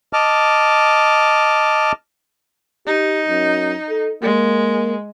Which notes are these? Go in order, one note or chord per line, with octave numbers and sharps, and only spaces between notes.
D#5 A5 D6 F6
D#4 G4
F#2
A4
G#3 A#3